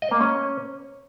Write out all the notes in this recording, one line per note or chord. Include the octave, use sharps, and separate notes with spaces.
D#5
A#3
C#4